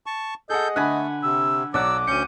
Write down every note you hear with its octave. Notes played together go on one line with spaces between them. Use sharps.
A5 C#6
G#4 A4 D#5 F#5 G6
D3 A3 F#5 G#5 B5
C3 E6
B1 F#3 D5 F#5 D6 E6
D2 C#4 G6 C#7 D#7